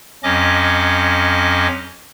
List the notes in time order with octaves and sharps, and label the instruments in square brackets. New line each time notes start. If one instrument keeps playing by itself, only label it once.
[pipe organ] F2 F#3 C#4 D#5 D6